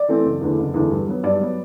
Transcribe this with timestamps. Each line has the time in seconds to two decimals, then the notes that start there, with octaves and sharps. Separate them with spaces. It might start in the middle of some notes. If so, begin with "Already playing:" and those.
Already playing: D5
0.08 E3 A3 C4
0.25 F#1
0.41 E2 D3 A3
0.58 F#1
0.74 E2 D3 A3
0.90 G2
1.08 F#3 B3
1.23 G2 D5
1.40 F#3 B3